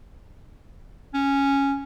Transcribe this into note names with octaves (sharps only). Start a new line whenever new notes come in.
C#4